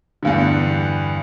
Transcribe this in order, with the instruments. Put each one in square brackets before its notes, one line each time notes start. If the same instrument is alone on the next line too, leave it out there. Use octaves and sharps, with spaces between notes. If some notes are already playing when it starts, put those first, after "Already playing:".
[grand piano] E2 G2 D3